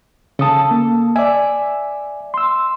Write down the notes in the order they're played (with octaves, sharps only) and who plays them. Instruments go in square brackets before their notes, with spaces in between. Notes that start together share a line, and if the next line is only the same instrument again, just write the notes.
[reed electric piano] C#3 D#6 [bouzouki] A4 A5
[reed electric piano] A#3
[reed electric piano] D5 G#5 [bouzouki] E5
[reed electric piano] C6 E6